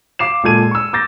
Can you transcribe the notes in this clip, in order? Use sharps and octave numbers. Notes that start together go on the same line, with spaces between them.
F5 D6 C7 E7
A#2 G#3 A4 G#6 D#7
C#6 E6
D6 G6 A6 A#6